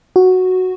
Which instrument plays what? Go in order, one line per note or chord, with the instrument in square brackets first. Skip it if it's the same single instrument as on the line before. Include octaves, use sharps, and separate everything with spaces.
[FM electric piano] F#4